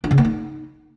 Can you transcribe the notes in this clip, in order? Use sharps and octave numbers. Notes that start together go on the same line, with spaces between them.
D4
C#3
A#3
D#4